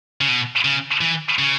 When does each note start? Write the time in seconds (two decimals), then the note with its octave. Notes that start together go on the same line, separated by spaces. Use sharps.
0.21 C#3
0.28 B2
0.65 C#3
1.01 E3
1.39 C#3